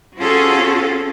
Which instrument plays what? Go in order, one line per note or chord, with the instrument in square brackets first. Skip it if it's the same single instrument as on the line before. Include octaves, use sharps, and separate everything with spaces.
[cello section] C4 C#4 F4 F#4 G#4 A4